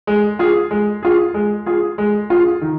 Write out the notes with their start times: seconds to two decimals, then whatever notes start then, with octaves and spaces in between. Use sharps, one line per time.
0.07 G#3
0.39 F4 G#4
0.71 G#3
1.03 F4 G#4
1.34 G#3
1.66 F4 G#4
1.98 G#3
2.30 F4 G#4
2.61 D#3